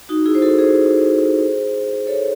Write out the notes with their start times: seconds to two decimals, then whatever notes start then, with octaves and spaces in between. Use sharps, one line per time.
0.09 D#4 F#4
0.26 E4 G#4
0.35 C5
0.42 F#4 A4
0.59 G#4 C5
2.07 A4 C#5